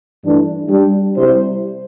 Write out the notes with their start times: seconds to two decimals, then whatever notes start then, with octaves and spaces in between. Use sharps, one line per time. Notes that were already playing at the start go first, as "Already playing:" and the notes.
0.22 G2 E3 A3 D4
0.69 G3 D4 G4
1.16 C3 G3 E4 C5